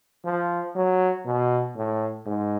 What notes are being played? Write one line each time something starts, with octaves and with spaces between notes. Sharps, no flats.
F3
F#3
B2
A2
G#2